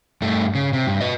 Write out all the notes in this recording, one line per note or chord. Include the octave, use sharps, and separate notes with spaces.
G2 A3
C#3
C3
G2
B4 D#5